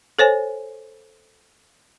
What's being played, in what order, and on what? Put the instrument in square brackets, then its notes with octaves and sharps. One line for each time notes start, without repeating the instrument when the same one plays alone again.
[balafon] A4 C5 C#5 G#5